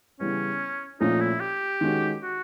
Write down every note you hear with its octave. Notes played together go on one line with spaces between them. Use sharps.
C#3 E3 G3 B3 C#4
A#2 F3 A3 C#4 D#4
E4
G4
D#3 G#3 C#4 F#4
F#4